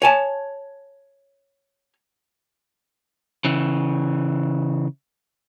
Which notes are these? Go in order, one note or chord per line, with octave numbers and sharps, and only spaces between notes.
C#5 G#5 A5
C#3 E3